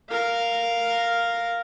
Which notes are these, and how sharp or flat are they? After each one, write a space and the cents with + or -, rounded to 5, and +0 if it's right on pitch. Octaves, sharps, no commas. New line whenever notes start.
A#4 -5 F5 +0